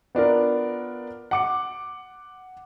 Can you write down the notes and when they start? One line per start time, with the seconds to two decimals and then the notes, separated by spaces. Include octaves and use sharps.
0.15 B3 D4 F4 A#4
1.31 F#5 D6 C#7